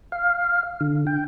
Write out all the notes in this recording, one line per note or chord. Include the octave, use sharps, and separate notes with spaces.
F5
D3
G5